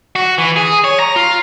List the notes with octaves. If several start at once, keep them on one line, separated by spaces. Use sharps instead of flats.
F#4
E3
G#4
C#5
A#5
F4